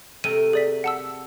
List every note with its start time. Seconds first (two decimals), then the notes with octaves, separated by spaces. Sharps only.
0.24 C3 A3 A#4 D#7
0.53 G#4 D5 B6
0.84 F#5 A5 E6